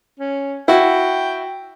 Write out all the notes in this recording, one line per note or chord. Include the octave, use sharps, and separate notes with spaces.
C#4
E4 F#4 G5